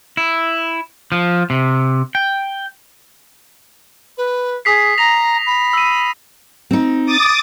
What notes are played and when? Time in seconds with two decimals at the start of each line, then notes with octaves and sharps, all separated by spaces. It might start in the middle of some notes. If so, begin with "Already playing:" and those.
0.17 E4
1.12 F3
1.50 C3
2.15 G5
4.17 B4
4.65 G#4 D#6 B6 C7
4.98 A#5 A#6 F7
5.46 B5
5.73 E6 D#7
6.71 C4 D#4
7.06 D6 D#6 A6